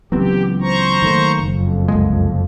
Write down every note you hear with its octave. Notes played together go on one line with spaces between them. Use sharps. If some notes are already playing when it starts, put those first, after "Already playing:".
C#2 E3 F#3 B3 C4 G4
C5 A#5 C#6
D#3 A3 A#3
F#1 F2
C2 G#3